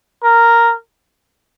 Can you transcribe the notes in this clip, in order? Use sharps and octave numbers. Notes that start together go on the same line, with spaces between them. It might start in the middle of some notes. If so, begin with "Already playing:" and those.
A#4